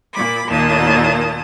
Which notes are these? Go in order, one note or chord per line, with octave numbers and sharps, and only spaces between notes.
A#2 B5 D6
D#2 A#2 A#3 A5 D#6